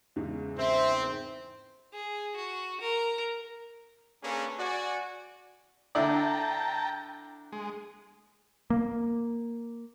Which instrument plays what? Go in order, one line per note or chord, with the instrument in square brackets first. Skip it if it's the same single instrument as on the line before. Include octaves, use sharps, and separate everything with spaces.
[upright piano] E2 G#2 C#3
[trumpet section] C4 [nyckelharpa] C5 [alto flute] E5
[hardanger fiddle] G#4
F#4
A#4
[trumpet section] A#3 C#4 D4 G#4 A4 B4
F#4 D5 G#5
[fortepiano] D3 E4 D5 [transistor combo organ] G5 A5 A#5
[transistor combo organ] G#3
[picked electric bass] A#3